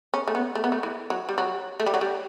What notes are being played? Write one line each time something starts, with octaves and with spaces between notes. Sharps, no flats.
C#4
A3
B3
A3
B3
A3
E3
F#3
G3
F#3
A3
G3
F#3
G3